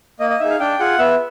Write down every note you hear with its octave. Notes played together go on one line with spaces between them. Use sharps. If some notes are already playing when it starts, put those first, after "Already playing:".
A#3 D#5
D#5
D#4 G#4 E5
F5
D4 G5
F4 G#4 F#5
B3 E5